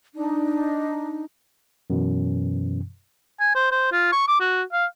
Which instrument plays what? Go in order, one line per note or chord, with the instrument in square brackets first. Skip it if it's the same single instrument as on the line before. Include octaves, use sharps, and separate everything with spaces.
[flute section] D4 D#4
[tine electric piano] F#2 B2 E3
[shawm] G#5
C5
C5
F4
C#6
D6
F#4
F5